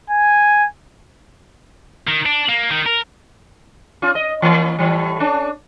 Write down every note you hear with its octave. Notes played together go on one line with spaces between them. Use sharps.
G#5
D#3
D4
A#3
D#3
A#4
C#4 F4
D#5
E3 A#3 C#4
A2 E3 G3
C#4 D4